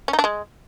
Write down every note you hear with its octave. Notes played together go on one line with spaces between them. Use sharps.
C#4
D#4
D4
G#3